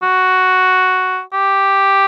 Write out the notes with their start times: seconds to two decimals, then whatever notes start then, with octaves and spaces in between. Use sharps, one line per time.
0.03 F#4
1.33 G4